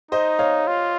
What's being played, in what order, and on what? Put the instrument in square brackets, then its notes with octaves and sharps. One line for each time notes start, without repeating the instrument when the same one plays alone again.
[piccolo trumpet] D#4 [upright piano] C5 D#5
[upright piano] C#5 F5
[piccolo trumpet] F4